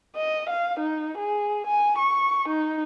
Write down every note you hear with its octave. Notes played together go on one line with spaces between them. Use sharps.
D#5
F5
D#4
G#4
G#5
C#6
D#4